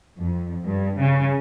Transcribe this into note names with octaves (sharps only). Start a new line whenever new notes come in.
F2
G2
C#3